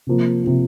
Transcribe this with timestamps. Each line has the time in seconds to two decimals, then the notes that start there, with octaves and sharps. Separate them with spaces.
0.07 C3 F3 A#3
0.43 C3 F3 A#3